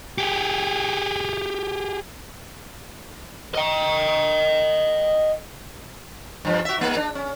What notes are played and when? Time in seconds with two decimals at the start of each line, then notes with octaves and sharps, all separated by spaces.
0.18 G4 G#4
3.55 D#5 G5
6.45 G2 F3
6.65 F#4 E5
6.78 G#2 A#3
6.97 D4
7.15 C#4